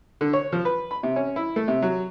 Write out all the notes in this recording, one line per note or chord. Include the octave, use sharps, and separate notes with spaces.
D3
C#5
F3
B4
B5
C3
C#4
E4
A3
C3
F#3